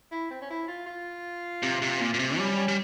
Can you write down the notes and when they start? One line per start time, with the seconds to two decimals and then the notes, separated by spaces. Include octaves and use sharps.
0.12 E4
0.31 C4
0.41 C#4
0.50 E4
0.68 F4
0.87 F4
1.63 C3
1.82 C3
2.01 A#2
2.14 A#2
2.19 C3
2.38 G3 C#4
2.57 C#4
2.68 G3